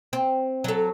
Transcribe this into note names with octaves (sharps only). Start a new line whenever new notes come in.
C4
F#3 A4